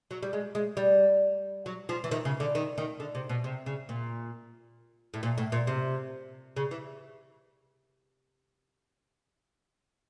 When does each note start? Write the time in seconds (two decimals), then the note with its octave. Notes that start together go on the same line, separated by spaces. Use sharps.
0.11 F#3
0.23 G3
0.33 G#3
0.55 G#3
0.77 G3
1.66 F#3
1.89 F3
2.04 E3
2.11 D#3
2.25 C#3
2.40 D3
2.55 D#3
2.78 D#3
3.00 D3
3.15 C3
3.29 B2
3.44 C3
3.66 C#3
3.89 A#2
5.14 A2
5.23 A#2
5.38 A2
5.52 A#2
5.67 C3
6.56 C#3
6.71 E3